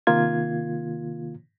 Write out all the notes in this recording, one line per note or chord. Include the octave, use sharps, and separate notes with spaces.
C3 D#3 A#3 F4 G#6